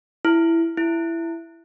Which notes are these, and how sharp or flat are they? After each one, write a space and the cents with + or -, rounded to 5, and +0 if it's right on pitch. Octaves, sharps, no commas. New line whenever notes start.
E4 +10
E4 +15